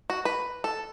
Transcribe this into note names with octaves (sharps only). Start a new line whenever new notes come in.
F#4
B4
A4